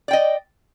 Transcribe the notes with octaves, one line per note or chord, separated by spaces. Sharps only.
D5 D#5 G5